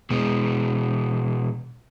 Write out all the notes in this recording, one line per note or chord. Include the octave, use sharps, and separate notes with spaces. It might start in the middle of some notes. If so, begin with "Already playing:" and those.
B2 G#3